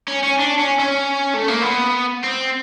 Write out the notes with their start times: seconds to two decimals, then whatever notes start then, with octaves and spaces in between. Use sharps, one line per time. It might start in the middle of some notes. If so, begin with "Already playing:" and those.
0.08 C#4
0.23 C#4
0.39 D4
0.59 C#4
0.80 C#4
1.34 A3
1.48 A#3
1.62 B3
2.24 C4